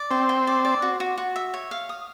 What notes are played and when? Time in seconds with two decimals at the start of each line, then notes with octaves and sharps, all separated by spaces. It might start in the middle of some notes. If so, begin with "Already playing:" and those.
Already playing: D5
0.11 C4 G5
0.29 G5
0.47 D5
0.65 D5
0.82 F#4
1.00 F#4
1.18 F#4
1.36 E5
1.54 C#5
1.71 F5
1.89 D#6